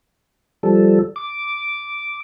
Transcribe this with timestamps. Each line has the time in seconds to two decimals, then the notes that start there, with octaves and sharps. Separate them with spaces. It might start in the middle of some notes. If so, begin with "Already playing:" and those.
0.63 F3 G3 A4
1.16 D6